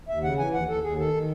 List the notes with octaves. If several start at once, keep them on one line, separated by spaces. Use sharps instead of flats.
D#2 E5
C#3 F#5
E3 G#5
D#2 F#5
D#2 A4
D#2 G#4
D#3 A4
D#3